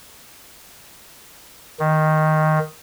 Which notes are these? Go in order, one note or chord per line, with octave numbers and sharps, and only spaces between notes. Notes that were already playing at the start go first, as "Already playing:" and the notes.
D#3